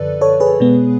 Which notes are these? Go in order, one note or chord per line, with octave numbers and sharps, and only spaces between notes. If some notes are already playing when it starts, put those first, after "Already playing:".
Already playing: F#2 D3 F3 A4 B4 D5
A4 C#5
G#4 B4
B2 G#3 B3